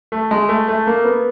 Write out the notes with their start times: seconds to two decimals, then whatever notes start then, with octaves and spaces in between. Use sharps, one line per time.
0.12 A3
0.31 G#3
0.49 A3
0.68 A3
0.87 A#3
1.05 B3